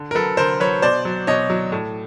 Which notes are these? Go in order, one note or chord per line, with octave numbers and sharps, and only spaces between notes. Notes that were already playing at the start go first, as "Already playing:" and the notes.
Already playing: D3
A#4
F#3 A4 B4
D3 A#4 C5
F#3 B4 C#5
B2 C5 D5
F#3
B2 C#5 D#5
F#3
A2